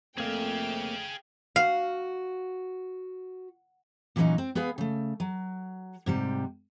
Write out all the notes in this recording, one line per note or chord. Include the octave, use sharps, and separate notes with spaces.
F2 A3 A#3 C4 G#4 F5 G5
F#4 F5
A#2 E3 F#3 C4 C#4 D#4
C4
B3 G#4 B4 F5
C#3 A3
F#3
G#2 C3 G3